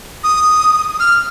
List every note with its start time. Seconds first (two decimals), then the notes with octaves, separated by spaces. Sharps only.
0.24 D#6
1.00 F6